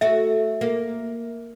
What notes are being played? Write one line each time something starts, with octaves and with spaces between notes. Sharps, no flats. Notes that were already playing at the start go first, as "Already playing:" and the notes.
A3 F#4 E5
A#3